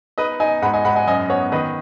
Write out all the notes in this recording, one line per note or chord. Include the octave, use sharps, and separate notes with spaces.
D#4 B4 D#5
D#4 D#5 G#5
G#2 F#5 B5
D#5 G#5
G#2 F#5 B5
D#5 G#5
F#2 D#5 G#5
B3 C#5 F#5
D#3 B4 D#5